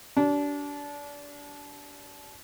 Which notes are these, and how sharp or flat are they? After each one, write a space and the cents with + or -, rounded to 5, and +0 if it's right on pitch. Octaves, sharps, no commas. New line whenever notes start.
D4 -25 G4 -40